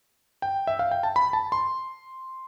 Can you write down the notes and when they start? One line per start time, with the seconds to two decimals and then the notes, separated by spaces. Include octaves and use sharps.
0.42 G5
0.67 E5
0.79 F5
0.91 G5
1.03 A5
1.16 B5
1.33 A5
1.52 C6